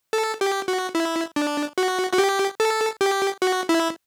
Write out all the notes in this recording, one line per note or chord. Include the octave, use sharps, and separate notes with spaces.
A4
G4
F#4
E4
D4
F#4
F#4
G4
A4
G4
F#4
E4